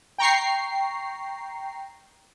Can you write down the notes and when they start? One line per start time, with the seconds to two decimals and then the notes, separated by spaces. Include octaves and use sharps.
0.18 G5 A#5 C#6 C7